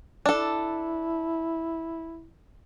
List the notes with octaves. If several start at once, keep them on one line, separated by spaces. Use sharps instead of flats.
D4 E4 A4